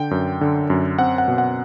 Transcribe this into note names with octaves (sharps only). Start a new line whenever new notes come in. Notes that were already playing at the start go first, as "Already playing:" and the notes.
Already playing: D3 G5
F#2
D3
F#2
C4 F#5
F#5
B2
F#5